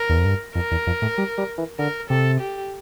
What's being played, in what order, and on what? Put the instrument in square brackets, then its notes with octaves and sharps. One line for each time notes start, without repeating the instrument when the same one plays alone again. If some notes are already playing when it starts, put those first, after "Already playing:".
Already playing: [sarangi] A#4
[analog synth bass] E2
F2
G2
[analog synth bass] F2 [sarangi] A#4
[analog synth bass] E2
F2
A2
G3
G3
E3
[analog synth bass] D3 [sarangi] A#4
[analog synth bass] C3 [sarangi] A4
[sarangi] G4